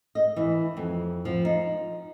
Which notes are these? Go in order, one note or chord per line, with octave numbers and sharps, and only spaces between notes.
D#5
E3
F2
F3
D#4